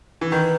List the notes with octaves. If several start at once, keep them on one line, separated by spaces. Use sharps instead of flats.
E3
D#3 B4